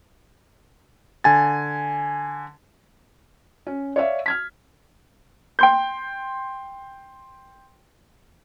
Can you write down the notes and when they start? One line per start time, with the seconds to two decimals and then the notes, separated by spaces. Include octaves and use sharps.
1.24 D3 G#5 A6
3.67 C#4
3.96 C#5 D5 E5 F5
4.26 F6 G#6 B6
5.59 G5 C6 G6